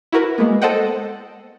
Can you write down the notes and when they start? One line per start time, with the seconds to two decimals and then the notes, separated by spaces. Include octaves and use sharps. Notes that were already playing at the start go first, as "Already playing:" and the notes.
0.12 E4 F#4 A#4 B4
0.38 G#3 A#3 B3
0.62 A4 C5 D#5 F#5 G5